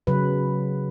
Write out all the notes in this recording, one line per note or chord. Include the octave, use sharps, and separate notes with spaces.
C#3 F#3 B4